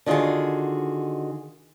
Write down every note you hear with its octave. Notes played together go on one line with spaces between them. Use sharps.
D3 D#3 F4 F#4 G#4